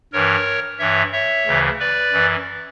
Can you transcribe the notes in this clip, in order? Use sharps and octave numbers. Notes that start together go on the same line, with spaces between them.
G2 E3 A#4 C#5
G2 E3 C#5 E5
C#5 E5
D2 C#3 E3
B4 D5
F#2 E3